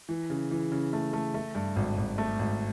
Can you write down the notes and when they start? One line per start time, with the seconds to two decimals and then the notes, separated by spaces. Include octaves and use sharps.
0.09 E3
0.30 C#3
0.51 E3
0.72 C#3
0.93 A3
1.13 A3
1.34 A3
1.55 G2
1.76 G#1
1.98 G#1
2.18 A3
2.39 G#1